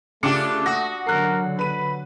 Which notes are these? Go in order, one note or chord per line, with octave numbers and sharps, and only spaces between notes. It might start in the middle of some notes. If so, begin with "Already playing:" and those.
C#3 A3 D4 F4 G4 D6 C#7
F#4 D#6 A#6
D3 F#3 A#4 F#6 C7
B4 B5 D#7